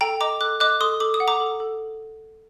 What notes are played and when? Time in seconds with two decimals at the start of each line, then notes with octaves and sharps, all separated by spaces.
0.01 A4 G5 A#5
0.21 D#5 A#5 D6
0.41 A4 D6 F#6
0.60 D#5 D6 F#6
0.81 A4 C6 D#6
1.00 A4 D6
1.14 D#6
1.20 F#5
1.28 A#5 D6
1.40 A4
1.60 A4